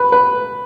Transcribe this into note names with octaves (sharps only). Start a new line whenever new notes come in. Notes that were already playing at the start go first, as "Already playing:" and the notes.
Already playing: B4
B4